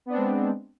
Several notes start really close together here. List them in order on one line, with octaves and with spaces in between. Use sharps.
B3 D4 C4 G#3